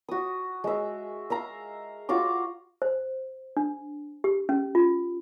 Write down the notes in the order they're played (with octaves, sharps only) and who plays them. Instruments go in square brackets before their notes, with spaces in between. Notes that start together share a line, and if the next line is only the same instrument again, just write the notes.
[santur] F#4 D#6
G#3 E5
E5 F5 A#5
F4 F#4 F5 D6
[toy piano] C5
D4
G4
C#4
F4